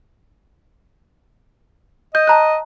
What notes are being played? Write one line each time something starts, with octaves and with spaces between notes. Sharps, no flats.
D#5 G6
A5 A#5 F#6